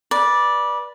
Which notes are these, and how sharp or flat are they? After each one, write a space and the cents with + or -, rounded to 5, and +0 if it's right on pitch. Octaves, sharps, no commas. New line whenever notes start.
B4 -25 D5 +0